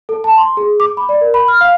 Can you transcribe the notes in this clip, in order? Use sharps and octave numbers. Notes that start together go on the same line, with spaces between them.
A4
A5
C6
G#4
D6
B5
D5
A#4
B5
F6
F5